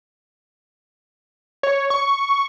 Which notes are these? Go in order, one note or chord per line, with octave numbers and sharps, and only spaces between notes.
C#5
C#6